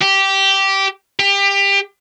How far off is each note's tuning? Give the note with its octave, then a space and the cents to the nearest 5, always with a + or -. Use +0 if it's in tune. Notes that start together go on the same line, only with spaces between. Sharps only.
G4 -10
G4 +25